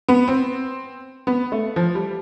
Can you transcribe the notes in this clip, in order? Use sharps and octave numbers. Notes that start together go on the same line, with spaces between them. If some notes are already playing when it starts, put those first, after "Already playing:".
B3
C4
B3
A3
F3
G3